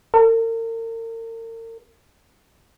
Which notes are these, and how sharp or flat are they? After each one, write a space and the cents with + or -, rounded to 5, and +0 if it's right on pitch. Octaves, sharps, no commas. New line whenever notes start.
A#4 -40